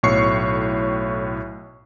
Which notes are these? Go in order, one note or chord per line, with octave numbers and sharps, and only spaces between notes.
B1 A2 C#5 C#6 C7